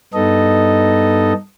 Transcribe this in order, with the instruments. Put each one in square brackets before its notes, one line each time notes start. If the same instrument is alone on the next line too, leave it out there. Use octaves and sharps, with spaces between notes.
[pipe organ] G2 B3 D#4 A4 D#5